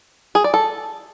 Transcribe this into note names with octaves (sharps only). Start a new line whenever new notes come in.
G#4
D5
A4